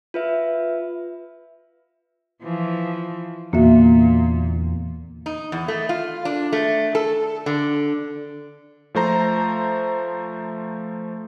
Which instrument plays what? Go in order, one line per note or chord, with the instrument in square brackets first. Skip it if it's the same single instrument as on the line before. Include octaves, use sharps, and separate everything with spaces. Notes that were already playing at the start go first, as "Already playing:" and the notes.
[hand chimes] F4 B4 E5
[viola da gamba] E3 F3
[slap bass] E2 D3 [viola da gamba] A#2 [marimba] A#3 F#4 E5
[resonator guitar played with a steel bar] D#4
E2
A3
F4
D4
A3
A4
D3
[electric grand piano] F3 A3 C5 A#5